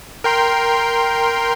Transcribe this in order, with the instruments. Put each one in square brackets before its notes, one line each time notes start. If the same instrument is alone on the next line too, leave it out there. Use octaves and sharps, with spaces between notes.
[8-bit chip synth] A#4 G5 C6